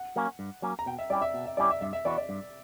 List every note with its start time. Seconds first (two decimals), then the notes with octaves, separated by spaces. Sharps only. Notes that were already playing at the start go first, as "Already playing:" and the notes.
Already playing: F#5
0.16 F#3 A#3 C#4
0.39 G2
0.62 F#3 A#3 C#4
0.79 A#5
0.86 B2 G5
0.99 E5
1.10 G3 C#4 E4 G4 D5
1.22 E5
1.34 B2
1.46 E5
1.57 G3 C#4 E4 G4 D5
1.70 E5
1.81 G2 E5
1.93 E5
2.05 E3 B3 F#4 D5
2.18 D5
2.29 G2